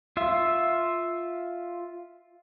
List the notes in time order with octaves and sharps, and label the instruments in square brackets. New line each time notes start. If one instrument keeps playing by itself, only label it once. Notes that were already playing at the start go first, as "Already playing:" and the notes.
[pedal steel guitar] F4 E5